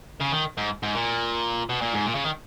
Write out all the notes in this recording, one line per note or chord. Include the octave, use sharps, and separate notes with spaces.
C#3
D#3
G#2
G#2
A#2
B2
A#2
G#2
A#2
C#3
D#3